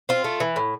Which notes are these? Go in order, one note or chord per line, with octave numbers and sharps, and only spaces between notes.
C4 F4
A3
E3
A2